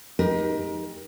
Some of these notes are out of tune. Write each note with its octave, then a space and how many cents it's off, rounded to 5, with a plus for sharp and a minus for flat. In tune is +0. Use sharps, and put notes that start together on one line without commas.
D#4 +5 G4 +25 A#4 +30